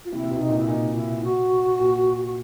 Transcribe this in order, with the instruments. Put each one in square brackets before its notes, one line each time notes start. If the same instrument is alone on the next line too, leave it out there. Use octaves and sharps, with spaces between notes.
[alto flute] F4
[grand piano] C3 [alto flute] E4
[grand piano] C3
B2
[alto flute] D#4
[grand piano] A#2
[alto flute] E4
[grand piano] A#2 [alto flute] D#4
[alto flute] E4
F#4
[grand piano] A#2
[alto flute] F#4